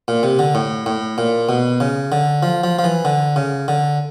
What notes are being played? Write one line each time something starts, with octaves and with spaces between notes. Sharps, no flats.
A#2
C3
D3
A2
A2
A#2
B2
C#3
D3
F3
F3
F3
E3
D3
C#3
D3